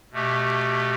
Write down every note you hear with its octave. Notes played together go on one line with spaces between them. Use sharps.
B2 A3 G4